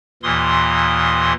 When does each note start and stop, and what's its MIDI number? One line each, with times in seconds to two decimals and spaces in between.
0.23 1.33 39
0.23 1.33 46
0.23 1.33 52
0.23 1.33 84
0.23 1.33 87